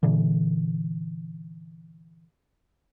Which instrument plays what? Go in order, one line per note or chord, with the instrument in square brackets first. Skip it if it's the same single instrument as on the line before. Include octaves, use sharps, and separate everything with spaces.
[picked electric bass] A#2 D3 E3